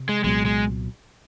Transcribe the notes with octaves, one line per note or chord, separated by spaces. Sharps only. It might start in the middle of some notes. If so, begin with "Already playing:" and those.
Already playing: C3
G#3
C2 A#2 F#3 G#3 B3
G#3